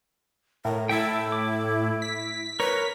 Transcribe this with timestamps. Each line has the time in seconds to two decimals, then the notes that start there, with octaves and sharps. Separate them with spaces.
0.65 A2 A#4
0.89 E4 A4 E5 G5
1.32 D6
2.02 B6
2.60 A#4 B4 C#5